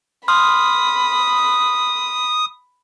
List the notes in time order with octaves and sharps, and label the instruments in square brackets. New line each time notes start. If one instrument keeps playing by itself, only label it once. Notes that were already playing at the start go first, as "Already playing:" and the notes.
[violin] B5 [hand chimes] C6 F6 [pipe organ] D#6